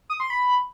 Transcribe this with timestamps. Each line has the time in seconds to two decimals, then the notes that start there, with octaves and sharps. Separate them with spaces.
0.10 D#6
0.20 C6
0.30 B5